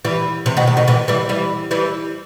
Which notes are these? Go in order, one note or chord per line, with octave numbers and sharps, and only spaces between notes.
E3 G3
C3 E3
B2 D#3
C3
B2 D#3
C3 E3
E3 G3
E3 G3
E3 G3